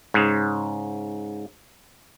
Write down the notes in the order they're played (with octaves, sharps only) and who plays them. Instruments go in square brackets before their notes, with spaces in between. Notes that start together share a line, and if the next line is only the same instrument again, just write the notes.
[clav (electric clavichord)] G#2 C#3